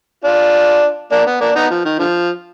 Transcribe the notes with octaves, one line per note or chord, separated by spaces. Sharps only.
D4 F4
A#3 D4
B3
A#3 D4
B3 D#4
F3
D#3
D3 F3